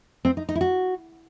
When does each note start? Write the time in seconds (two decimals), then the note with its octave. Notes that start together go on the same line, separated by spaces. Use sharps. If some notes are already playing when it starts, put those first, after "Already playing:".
0.25 C4
0.37 D#4
0.49 D#4
0.55 E4
0.61 F#4